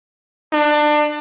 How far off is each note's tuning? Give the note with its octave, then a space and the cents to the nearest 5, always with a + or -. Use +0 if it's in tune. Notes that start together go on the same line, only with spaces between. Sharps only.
D4 +25